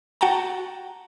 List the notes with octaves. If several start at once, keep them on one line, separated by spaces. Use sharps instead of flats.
F#4 F#5 G5 A5 A#5